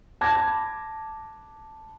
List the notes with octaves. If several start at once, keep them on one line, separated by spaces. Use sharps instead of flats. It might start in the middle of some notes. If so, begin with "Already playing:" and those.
A5 B5 D6 G#6 A#6